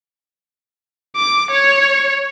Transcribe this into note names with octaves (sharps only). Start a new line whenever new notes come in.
D6
C#5